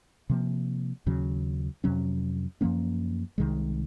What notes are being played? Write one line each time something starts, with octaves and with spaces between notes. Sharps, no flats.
C3 F3 A#3
D#2 C#3 F#3
F2 C3 F#3 C#4
F#2 F3 A#3 C#4
C2 C3 D#3 G#3